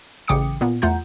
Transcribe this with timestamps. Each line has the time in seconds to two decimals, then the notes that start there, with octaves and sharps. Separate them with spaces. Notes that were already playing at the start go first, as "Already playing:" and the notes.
0.28 A1 C#3 G5 D6 D#6 C#7
0.61 A#2 B3
0.82 E2 A3 F4 F#5 A#5 G6